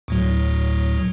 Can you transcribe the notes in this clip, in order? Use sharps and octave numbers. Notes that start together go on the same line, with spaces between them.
D2 A2 F#3